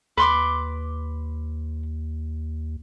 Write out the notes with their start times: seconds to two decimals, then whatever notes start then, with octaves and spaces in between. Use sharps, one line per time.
0.17 D#2 B4 C6 D6